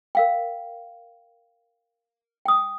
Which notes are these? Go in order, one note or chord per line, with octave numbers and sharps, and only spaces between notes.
A#4 F5 G5
G5 D#6